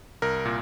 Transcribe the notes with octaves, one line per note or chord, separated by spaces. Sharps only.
C2 A#4
A#2